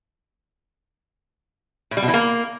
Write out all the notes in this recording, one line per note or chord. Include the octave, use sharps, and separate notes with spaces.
A2
G3
B2
E3
A#3